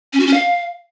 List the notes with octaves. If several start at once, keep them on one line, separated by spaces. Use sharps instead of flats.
C#4
F#4
C#4
F5